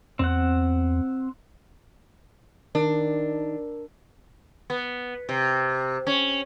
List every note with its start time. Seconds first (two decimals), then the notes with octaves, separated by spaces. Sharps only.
0.19 E2 C4 F#5
2.75 D#3 D4 A#4
4.70 B3
5.29 C3
6.07 C#4